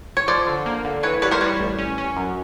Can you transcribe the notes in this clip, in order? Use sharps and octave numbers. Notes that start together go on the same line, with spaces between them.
C#5
F3 C5 D5
D3
A#3
D3
E3 B4 C#5
G3 B4 C#5
A#4 C5
G3 B4 C#5
A1
C#4
C#4
F#2